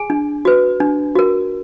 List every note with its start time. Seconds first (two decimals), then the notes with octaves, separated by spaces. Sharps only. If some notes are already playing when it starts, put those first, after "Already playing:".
Already playing: G#4 G#5
0.10 D4
0.45 F#4 B4
0.80 D4
1.15 F#4 A#4